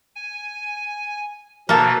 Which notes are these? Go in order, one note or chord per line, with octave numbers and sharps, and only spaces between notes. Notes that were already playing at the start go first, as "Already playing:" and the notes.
G#5
B2 E3 F3 A#3 A4